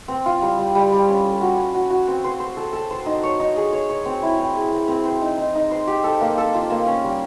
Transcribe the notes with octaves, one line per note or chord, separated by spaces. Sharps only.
C4
F4
G3
G3
G3
G3
C#4
A4
F#4
C#4
F#4
F#4
C4
C5
C5
A4
A4
C5
D#4
C#5
D#4
G#4
C#5
C#5
C4
E4
C4
G#4
C4
C4
C5
D#4
D#4
D#4
C5
G4
A4
A#3
A4
F4
A#3
C#4
G3